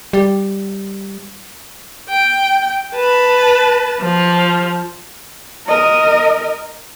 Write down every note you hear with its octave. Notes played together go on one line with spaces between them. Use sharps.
G3
G5
B4 A5
F3
A#4 D#5